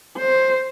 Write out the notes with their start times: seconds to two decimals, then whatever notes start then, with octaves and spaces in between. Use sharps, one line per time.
0.17 C5